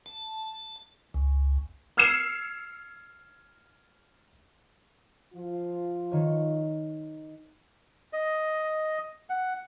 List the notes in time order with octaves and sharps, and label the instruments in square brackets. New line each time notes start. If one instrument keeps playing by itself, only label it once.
[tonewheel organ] A5
C#2
[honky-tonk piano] E6 F6 G#6 C7 C#7 E7
[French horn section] F3 F4
[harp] D#3 C#5
[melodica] D#5
F#5